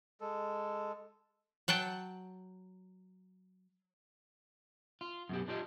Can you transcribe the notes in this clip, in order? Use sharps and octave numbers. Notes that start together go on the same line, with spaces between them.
G#3 A4
F#3 F#5 G5 A5
F4
F#2 B2 G4
D4 F4 G4 D#5